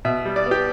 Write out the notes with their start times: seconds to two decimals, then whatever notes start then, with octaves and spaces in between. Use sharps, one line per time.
0.05 B2 E5
0.25 G3
0.36 D5
0.46 B3
0.51 G4